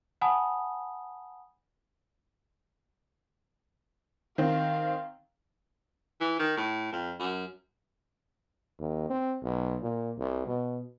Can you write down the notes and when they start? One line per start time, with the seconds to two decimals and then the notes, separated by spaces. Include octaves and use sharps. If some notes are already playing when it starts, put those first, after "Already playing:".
0.21 F#5 G#5 A5 B5 D#6
4.38 D#3 C4 F5
6.21 E3
6.39 D#3
6.57 A2
6.93 F2
7.19 F#2
8.79 D#2
9.10 C4
9.42 B1
9.82 A#2
10.18 C2
10.47 B2